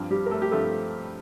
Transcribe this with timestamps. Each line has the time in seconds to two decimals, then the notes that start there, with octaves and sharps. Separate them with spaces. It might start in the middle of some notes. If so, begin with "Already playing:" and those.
Already playing: G2 F3 C4
0.11 G3 G4
0.26 A#4
0.31 A3 A4
0.42 G4
0.51 G2 F3 A3 C4 A4